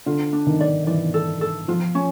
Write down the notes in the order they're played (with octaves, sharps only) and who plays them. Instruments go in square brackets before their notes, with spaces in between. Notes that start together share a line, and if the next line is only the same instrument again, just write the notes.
[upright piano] D3 [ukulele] F4
[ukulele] D4
[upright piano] D#3
[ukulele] D5
[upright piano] E3 [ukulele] D5
[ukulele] A4
A4
[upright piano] F3 [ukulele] F4
[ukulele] C#4